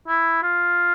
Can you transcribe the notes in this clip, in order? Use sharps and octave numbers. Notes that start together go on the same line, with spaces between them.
E4
F4